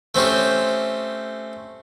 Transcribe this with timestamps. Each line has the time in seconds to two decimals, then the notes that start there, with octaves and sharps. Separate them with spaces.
0.15 A3 C4 C#4 G4